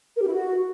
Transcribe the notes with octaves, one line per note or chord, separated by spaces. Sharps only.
A#4
G4
E4
F#4